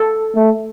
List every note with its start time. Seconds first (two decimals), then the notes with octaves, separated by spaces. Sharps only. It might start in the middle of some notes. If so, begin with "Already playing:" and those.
Already playing: A4
0.36 A3